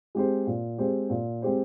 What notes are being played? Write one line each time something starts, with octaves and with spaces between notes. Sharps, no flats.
G#3 C4 G4 C5
A#2
G#3 C4 G4 C5
A#2
G#3 C4 G4 C5